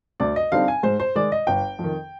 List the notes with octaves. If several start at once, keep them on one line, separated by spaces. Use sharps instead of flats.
D2 D5
D#5
D3 G3 C4 D#4 F5
G#5
G#2 C5
C5
D#3 G#3 D5
D#5
G1 G5
F2
D#3